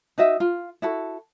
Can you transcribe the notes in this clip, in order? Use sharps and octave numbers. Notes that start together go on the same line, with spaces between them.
D#4 F#4 D#5 E5
F4
E4 F#4 A4